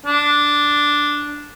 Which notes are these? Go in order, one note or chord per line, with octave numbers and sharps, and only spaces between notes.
D4